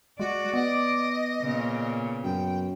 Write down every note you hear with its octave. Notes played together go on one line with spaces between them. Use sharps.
G#3 F#4 D5
B3 D#5
A#2 C#3
F#2 G5